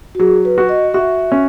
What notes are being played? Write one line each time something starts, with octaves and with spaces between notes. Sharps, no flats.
F#4
F#3 G#4
B4
F#4
D#5
F#4 E5
C#4